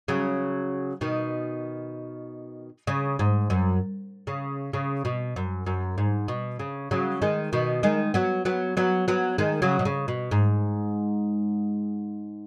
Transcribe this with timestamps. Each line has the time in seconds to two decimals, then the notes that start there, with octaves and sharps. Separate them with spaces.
0.08 C#3 F#3
1.01 B2 D#3
2.87 C#3
3.19 G#2
3.50 F#2
4.27 C#3
4.73 C#3
5.05 B2
5.36 F#2
5.66 F#2
5.98 G#2
6.28 B2
6.59 C#3
6.91 C#3 F#3
7.22 D#3 G#3
7.53 B2 D#3
7.83 D#3 G#3
8.14 F#3 B3
8.45 F#3 B3
8.77 F#3 B3
9.08 F#3 B3
9.38 D#3 G#3
9.62 C#3 F#3
9.79 B2
9.85 C#3
10.08 B2
10.31 G#2